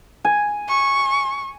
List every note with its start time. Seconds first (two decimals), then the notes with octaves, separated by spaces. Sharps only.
0.24 G#5
0.69 C#6